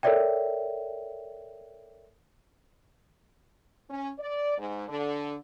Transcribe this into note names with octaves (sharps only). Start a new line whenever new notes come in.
A4 A#4 C#5 D5 E5 G5
C#4
D5
G#2
D3